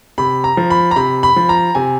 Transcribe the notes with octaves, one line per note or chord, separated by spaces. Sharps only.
C3 B5
A#5
F3
B5
A#5
C3 B5
B5
F3
A#5
C3 G#5